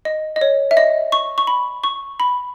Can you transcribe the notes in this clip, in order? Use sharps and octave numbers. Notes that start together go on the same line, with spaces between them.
D#5
D#5
C#5
E5
D#5
C#6
C#6
B5
C#6
B5